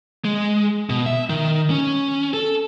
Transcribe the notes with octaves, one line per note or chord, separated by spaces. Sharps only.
G#3
B2
E5
D#3
C#4
A4